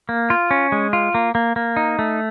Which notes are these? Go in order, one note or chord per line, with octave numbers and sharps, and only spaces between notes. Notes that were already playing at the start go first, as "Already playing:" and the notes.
A#3
F4
C#4
G#3
F4
A#3
A#3
A#3
D#4
A3